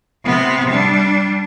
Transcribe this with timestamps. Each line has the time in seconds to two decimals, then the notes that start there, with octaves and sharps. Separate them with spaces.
0.24 C3 B3
0.69 G3 D4